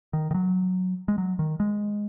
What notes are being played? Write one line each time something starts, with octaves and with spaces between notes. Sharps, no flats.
D#3
D#3
F#3
G#3
F#3
D#3
G#3